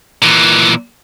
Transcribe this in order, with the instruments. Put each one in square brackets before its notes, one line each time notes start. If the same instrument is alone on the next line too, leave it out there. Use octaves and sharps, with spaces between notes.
[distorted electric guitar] A#2 E3